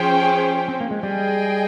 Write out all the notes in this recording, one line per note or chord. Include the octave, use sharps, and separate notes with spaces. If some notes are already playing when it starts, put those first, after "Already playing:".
Already playing: F3 C#4 G#4 C5 G5
C4
A#3
G#3
G3 G#4 D#5 G5